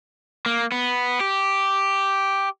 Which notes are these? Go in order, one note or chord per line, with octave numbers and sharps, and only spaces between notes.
A#3
B3
G4